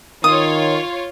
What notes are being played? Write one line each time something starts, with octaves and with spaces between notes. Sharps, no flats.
D#3 F4 C#5 D#6